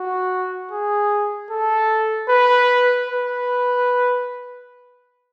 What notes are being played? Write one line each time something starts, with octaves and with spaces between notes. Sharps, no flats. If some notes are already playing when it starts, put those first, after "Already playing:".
Already playing: F#4
G#4
A4
B4
B4